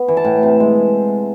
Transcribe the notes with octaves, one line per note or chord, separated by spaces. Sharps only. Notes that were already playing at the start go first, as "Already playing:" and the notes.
Already playing: B3
E3
A5
A2
C3
G#3